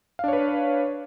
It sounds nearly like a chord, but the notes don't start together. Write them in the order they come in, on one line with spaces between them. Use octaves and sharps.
F5 D4 C#5 B4